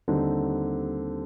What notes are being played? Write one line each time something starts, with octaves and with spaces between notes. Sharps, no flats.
D#2 D3 G3 C4 D#4